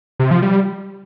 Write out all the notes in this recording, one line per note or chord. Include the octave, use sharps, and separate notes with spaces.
C3
F3
G3